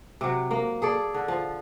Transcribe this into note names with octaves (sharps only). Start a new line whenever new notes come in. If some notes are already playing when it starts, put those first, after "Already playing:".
C3 F#3
A#3
G#4 A4 D5
D3
F3